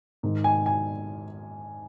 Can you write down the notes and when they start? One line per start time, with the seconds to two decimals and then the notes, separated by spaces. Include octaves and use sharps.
0.23 G#2 D#3
0.44 G#5
0.66 G#5